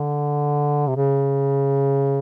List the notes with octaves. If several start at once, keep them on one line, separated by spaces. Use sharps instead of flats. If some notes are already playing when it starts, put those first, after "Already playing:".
Already playing: D3
C3
C#3